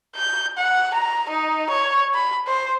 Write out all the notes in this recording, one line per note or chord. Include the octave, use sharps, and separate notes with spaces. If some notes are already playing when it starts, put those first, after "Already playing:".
G6
F#5
A#5
D#4
C#5
B5
C5